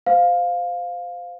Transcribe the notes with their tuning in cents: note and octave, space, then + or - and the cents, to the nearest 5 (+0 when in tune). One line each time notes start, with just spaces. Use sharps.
C5 -30 F5 +10